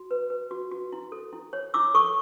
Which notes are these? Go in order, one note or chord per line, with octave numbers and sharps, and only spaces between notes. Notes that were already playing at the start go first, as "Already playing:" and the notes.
Already playing: F#4
B4
B4
F#4
F#4
E4
A4
E4
C#5
E4 D6 E6
A4 C#6 D#6